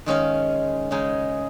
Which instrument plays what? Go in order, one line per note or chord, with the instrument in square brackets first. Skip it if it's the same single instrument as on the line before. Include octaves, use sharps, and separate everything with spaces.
[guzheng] D#3 G#3 C#4 F5
C#3 G#3 D#4